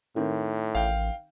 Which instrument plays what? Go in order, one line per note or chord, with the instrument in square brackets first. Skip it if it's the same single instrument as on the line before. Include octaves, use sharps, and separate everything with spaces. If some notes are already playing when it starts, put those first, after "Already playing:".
[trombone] A2 [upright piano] D#3 C4
[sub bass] A1 [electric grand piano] F5 G5